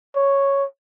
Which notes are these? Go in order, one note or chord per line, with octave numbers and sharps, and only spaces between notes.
C#5